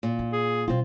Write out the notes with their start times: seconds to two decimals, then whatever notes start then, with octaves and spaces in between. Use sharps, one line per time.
0.03 A#2
0.19 D#4
0.33 G#4
0.68 B2 G3 C4 F4